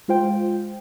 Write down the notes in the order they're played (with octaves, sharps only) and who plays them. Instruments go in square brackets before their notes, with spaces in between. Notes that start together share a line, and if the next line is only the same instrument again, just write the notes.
[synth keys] G#3 F4 C5 G5